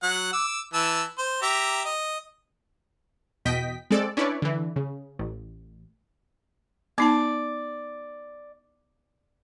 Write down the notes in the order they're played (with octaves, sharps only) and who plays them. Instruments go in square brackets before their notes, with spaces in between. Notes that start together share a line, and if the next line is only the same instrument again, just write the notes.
[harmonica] F#3 F#5
D6 E6
E3 A5 E6
C5
G4 E5 A#5
D#5
[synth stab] E2 B2 D#5 G5 B6
G#3 C4 A4 D5
C#4 D4 E4 B4 C#5 D5
D3 E3
C#3
A1
[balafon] B3 D#4 A5 [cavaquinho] D5